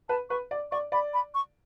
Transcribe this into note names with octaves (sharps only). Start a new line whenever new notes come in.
B4 A5
B4 C#6
D5
D5 C#6
D5 B5
B5
C#6